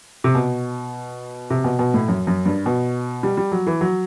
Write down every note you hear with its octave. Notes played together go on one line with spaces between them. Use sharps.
C3
B2
C3
B2
B2
A2
F#2
F#2
G2
B2
G3
G3
F#3
E3
F#3